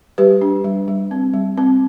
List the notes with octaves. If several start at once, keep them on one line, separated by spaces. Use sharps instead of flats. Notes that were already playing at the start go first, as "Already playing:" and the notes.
G3 G4 B4
D4
G3
G3
C4
G3
C4